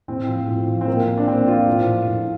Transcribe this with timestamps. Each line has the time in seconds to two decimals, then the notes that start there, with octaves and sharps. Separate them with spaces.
0.08 A2 C4
0.28 F3
0.48 A2
0.68 F3
0.81 C4
0.87 A#2 A#3
1.08 F3 C4
1.17 D4
1.28 A#2 C4
1.47 F3 F4
1.67 A2
1.87 F3
2.07 A2